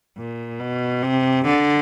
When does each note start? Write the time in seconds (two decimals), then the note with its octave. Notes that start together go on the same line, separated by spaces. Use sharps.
0.18 A#2
0.60 B2
1.03 C3
1.45 D3